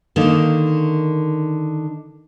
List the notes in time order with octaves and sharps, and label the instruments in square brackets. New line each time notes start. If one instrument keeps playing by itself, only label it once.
[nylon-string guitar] D3 D#3 A#3